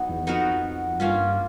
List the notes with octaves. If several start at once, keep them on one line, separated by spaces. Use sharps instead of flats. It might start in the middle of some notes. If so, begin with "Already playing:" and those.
Already playing: F#3 B3 D#4
E2
F2 B3 D#4 F#4 A#4
G2 A#3 C#4 F4